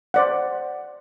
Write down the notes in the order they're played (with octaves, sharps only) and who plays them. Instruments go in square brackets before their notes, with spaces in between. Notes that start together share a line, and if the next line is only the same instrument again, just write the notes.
[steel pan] C5 D5 F#5